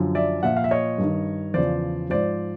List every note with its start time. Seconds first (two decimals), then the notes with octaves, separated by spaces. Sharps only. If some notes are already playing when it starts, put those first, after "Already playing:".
Already playing: F#2 D3 F3
0.15 D5 E5
0.43 A#2 F3 E5 F#5
0.57 F5
0.64 E5
0.71 C#5 D#5
0.98 G2 D#3
1.54 E2 C#3 F3 C5 D5
2.10 G#2 F3 C5 D5